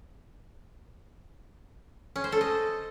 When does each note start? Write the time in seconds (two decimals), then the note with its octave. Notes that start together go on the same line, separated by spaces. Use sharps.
2.16 C#4
2.24 C5
2.32 A4
2.41 D#5